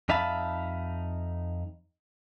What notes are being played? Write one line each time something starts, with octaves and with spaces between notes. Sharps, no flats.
F2 D#4 E5 F5 A5 B5